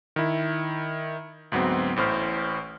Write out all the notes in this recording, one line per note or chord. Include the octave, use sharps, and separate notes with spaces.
D#3 E4
D2 G#2 F#3 B3 C4
A1 A2 C5 F6